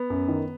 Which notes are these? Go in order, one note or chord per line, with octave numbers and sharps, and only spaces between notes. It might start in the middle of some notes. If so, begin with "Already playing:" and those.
Already playing: B3
F#2
D#3